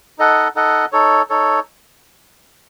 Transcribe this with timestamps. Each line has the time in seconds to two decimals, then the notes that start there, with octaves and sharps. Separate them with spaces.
0.18 D#4 A4 D#5 F#5
0.55 D#4 A4 D#5 F#5
0.92 D#4 A4 C#5
1.30 D#4 A4 C#5